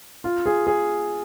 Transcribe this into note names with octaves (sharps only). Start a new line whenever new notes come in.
F4
G#4
G#4